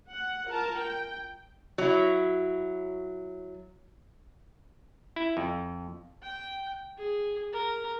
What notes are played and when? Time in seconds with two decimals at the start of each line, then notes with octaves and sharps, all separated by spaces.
0.11 F#5
0.47 F4 A#4 A5
0.78 G5
1.78 F#3 E4
5.16 E4
5.37 F2
6.22 G5
6.98 G#4
7.53 A#4